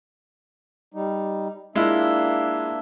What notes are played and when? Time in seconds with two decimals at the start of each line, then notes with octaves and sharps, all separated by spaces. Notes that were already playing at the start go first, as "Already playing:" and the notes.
0.94 G3 D#4
1.75 G#3 A#3 D4 E4 F4 E5